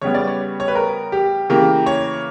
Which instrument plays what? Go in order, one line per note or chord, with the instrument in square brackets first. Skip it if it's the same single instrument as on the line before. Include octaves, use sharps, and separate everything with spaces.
[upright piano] C#3 G3 B3 C#5
D5
C#5
C#5
B4
A#4
G4
C#3 E3 A#3 G4
C#5